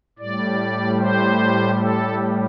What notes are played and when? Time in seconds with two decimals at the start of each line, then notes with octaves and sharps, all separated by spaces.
0.19 A2 G3 D5
0.99 C5
1.79 A4